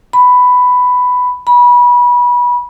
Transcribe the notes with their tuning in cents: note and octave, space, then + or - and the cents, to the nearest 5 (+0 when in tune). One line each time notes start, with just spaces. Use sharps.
B5 +10
B5 -25